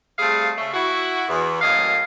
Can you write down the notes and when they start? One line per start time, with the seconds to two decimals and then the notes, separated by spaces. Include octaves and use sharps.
0.19 G3 A3 C4 F4 G#4 F5
0.58 C#3 A3
0.74 E4 F#4
1.28 E2
1.61 F#2 A2 F#3 A#3 D#5 F5